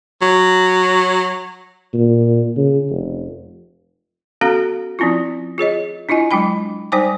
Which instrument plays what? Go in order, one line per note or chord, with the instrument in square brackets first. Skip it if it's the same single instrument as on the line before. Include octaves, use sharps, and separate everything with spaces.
[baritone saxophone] F#3
[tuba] A#2
C#3
F1
[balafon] B3 C#4 F#4 A4 F5 A#5
F3 C4 C#4 E4 F4
F4 G#4 C#5 D#5
D4 E4 F4 D#5 G#5
F#3 G#3 D4 G5 B5
G3 D#4 C5 G5 G#5 D6